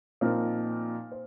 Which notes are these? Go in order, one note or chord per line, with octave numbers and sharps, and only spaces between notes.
A#2 F3 C4 D#4 A#4
C5